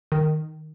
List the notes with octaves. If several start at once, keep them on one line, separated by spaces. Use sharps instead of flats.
D#3